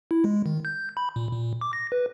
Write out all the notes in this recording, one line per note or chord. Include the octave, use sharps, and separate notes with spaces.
E4
G#3
D#3
G6
B5
A#2
A#2
D6
A#6
B4